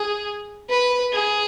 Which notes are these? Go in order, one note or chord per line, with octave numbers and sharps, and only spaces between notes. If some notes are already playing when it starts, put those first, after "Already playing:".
Already playing: G#4
B4
G#4